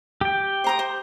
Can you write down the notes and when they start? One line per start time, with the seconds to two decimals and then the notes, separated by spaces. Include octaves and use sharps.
0.21 G4 G5
0.64 C5 A#5 D#6
0.79 C5